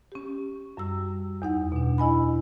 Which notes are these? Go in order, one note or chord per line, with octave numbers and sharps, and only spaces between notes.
C#4 G4
F#2 G3 E6
E2 D#4 F#5
B2 D4
E4 D#5 G#5 B5